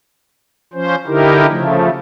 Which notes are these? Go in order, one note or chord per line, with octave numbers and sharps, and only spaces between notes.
F3 C#4 C5
D3 D#4 E4 G4 A#4
C#3 F3 A3